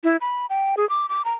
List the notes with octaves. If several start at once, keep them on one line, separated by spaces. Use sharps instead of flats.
E4
B5
G5
G#4
D6
D6
A#5